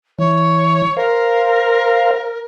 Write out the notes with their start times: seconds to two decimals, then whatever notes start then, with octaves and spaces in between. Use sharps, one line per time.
0.19 E3 C#5
0.97 A#4 C5 F5